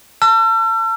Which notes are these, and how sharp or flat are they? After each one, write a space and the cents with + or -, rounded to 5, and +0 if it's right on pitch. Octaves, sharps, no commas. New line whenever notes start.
A5 +25 E6 +45